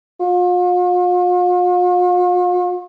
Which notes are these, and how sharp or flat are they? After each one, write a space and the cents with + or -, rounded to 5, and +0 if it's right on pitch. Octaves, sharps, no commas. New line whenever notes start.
F4 +45